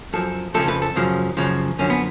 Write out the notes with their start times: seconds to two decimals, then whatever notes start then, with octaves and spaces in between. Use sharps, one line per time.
0.13 F#2 F3 A4
0.54 F2 C#3 F3 A4
0.68 B4
0.82 A4
0.96 F#2 C#3 F3
1.37 F#2 C#3 F3
1.79 F#2 D3 F3 C#4
1.90 B3